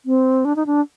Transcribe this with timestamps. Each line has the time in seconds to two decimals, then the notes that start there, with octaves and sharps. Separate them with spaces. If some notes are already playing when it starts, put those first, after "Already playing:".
0.06 C4
0.45 D4
0.56 D#4
0.66 D4